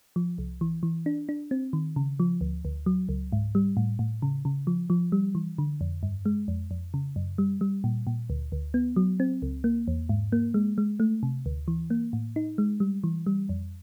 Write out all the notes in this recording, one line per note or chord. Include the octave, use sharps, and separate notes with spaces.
F3
C2
E3
E3
D4
D4
C4
D#3
C#3
F3
D2
D2
F#3
C#2
G#2
G3
A2
A2
C#3
C#3
F3
F3
G3
E3
D3
F2
G2
G#3
F2
F2
C#3
F#2
G3
G3
A#2
A#2
D2
D2
B3
F#3
C4
C#2
A#3
E2
G#2
A#3
G#3
G#3
A3
C3
D2
E3
A#3
A2
D#4
G#3
G3
E3
G3
F2